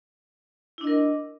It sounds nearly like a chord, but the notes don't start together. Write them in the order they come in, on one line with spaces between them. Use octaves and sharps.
E4 D4 D#5 A#4